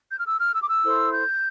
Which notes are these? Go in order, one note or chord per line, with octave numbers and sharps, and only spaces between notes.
G6
F6
E6
F6
E6
D6
E6
E4 A4 C5
G6